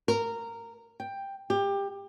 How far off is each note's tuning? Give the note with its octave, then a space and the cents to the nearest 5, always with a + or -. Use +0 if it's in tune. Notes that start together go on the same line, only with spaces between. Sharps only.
A#4 -15
G5 +10
G4 +20